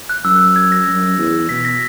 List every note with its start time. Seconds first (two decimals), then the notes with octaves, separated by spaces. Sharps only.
0.09 F#6
0.25 F#2 E6
0.36 F#6
0.56 G#6
0.72 A#6
0.87 F#2
1.18 E2
1.49 B2 B6
1.65 A#6